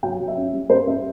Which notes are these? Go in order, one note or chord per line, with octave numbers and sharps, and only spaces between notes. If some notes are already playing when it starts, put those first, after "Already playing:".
F#3 G5
F#3
E5
C#4
G3
G3 C5
G3 E5